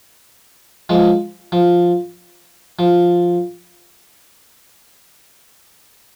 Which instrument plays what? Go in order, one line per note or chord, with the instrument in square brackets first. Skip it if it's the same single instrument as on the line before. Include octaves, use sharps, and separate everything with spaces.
[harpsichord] F3 G#3
F3
F3